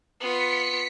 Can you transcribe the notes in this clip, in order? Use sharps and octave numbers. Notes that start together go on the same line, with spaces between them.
B3 F4 B6 C#7